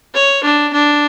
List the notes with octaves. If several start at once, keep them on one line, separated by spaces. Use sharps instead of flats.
C#5
D4
D4